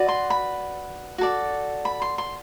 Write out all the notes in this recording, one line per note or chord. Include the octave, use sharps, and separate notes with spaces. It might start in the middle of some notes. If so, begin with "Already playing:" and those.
Already playing: F#4 B4 D5
C6
B5
F#4 A4 D5
B5
C6
C6